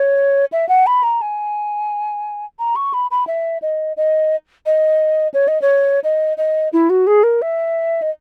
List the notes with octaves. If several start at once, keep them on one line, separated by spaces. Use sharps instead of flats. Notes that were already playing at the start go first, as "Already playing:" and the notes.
Already playing: C#5
E5
F#5
B5
A#5
G#5
A#5
C#6
B5
B5
E5
D#5
D#5
D#5
C#5
D#5
C#5
D#5
D#5
E4
F#4
G#4
A#4
E5
D#5